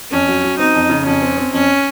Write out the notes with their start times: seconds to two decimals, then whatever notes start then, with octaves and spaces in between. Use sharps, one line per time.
0.12 F2 C#4
0.28 F#3
0.43 F#3
0.59 C4 D#4
0.75 F2
0.90 C#3
1.06 F2 C#4
1.22 C4
1.38 C4
1.53 F2 C#4